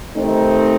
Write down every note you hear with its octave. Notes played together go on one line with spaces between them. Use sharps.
C3 D#3 A3 C4 D#4